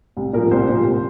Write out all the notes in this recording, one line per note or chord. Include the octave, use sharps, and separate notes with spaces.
C2
A#2 F3 A#4
C2 C5
A#2 F3
C2